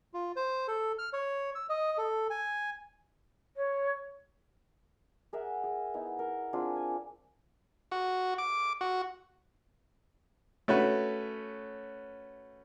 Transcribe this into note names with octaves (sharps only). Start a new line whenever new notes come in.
F4
C5
A4
F6
C#5
E6
D#5
A4
G#5
C#5
G#4 A#4 E5 F#5
G#4
B3 D#4 E4
A#4
C4 D4 F4 G#4
G#5
F#4
D6
F#4
A3 C#4 F#4 B4